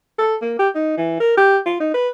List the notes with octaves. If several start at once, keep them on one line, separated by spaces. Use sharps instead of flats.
A4
A#3
G4
D#4
E3
A#4
G4
F4
D#4
B4